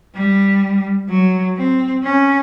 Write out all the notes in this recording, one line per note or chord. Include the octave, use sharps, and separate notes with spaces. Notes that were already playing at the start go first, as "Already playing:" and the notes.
G3
F#3
C4
C#4